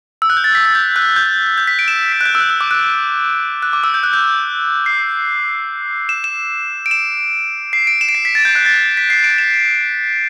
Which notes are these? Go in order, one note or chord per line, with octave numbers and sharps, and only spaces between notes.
E6
F#6
G6
A6
B6
A6
G6
F#6
G6
G6
B6
D7
E7
B6
F#6
G6
E6
F#6
E6
D6
F#6
F#6
D6
E6
G6
F#6
G6
C7
E7
E7
D7
E7
C7
D7
E7
D7
C7
B6
A6
G6
F#6
A6
B6
C7
D7
E7